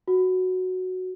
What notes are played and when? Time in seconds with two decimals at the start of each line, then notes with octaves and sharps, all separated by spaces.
0.08 F#4